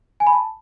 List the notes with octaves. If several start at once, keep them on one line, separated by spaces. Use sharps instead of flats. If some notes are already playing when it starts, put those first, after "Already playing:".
G#5
B5
A5